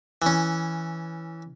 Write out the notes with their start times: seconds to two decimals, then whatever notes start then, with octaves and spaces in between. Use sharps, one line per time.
0.22 E3 C#4